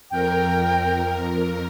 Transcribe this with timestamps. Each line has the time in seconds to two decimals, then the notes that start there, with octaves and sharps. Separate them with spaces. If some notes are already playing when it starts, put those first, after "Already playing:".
0.11 F2 A#4 G5